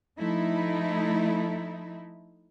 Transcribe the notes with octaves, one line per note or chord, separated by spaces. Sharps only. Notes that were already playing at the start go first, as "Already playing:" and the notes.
F3 A3 D#4 E4